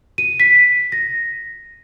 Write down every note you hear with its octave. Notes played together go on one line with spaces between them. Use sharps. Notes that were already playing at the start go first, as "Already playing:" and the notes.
D#7
B6
A#6